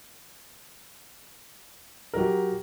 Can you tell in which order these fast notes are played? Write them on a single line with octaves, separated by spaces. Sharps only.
A#4 F#3 G4